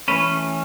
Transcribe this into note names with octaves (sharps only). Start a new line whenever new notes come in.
E3 A3 C#4 B4